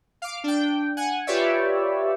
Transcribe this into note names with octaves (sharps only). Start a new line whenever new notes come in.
F5 D6
D4 G5
F#5 G#5
F4 G4 B4 C#5 D5 E5